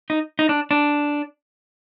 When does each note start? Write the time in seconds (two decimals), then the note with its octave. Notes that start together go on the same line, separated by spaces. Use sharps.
0.10 D#4
0.39 D#4
0.49 D4
0.71 D4